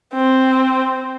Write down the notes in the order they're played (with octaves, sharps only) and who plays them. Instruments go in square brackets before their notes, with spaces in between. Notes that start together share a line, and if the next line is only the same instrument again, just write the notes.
[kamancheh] C4